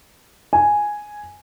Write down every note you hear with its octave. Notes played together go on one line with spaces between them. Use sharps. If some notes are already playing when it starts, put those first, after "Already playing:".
G#5